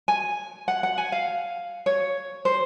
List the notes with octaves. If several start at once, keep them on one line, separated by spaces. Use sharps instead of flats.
G#5
F#5
F#5
G#5
F5
C#5
C5